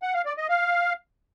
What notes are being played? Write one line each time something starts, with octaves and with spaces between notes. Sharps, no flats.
F#5
F5
D5
D#5
F5